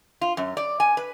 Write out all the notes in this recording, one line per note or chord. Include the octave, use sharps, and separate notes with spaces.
F4
F#2
D5
G#5
B4